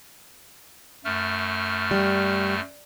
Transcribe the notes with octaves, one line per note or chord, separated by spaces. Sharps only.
F#2 A3 F6
G3